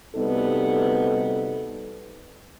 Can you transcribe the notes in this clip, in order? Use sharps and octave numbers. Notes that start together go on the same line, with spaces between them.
D2 C3 G3 B3 D#4 A4